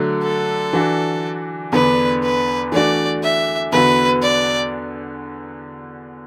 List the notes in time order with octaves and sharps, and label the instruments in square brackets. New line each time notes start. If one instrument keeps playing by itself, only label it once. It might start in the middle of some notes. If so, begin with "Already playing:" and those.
Already playing: [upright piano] D3 F#3 A3
[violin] A4
[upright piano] E3 D4 F#4
[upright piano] E2 D3 B3 D4 [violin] B4
[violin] B4
[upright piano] E3 A3 D4 F#4 [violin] D5
[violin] E5
[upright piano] E2 D3 B3 F#4 [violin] B4
[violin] D5